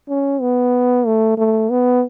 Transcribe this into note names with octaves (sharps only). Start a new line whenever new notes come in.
C#4
B3
A3
A3
B3